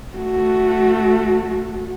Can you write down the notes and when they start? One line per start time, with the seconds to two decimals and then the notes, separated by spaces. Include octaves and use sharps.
0.16 A3 F#4